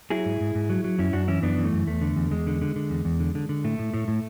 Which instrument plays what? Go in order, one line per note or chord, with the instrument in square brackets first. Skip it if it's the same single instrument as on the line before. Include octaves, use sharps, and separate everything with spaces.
[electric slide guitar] F#3 E4 G#4
G#2
G#2
G#2
F#3
F#3
F#2 C#4 E4
F#2 D4 F#4
E3 C#4 E4
F#2 B3 D4
E3
A3
F#2
E2 A3
D3
E2
E2 G#3
D3
D3
D3
E2
E2
D3
D3
D3
A2 A3
A2
A2
A2